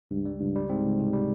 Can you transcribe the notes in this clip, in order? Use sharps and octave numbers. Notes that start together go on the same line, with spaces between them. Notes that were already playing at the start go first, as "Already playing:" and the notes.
C#2 G2
G3
C#2 G2
G3
G#2 C4
C#2
C3
G3